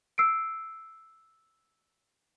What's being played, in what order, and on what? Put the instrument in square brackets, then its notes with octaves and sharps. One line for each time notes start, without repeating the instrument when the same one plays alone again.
[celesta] E6 C7 D7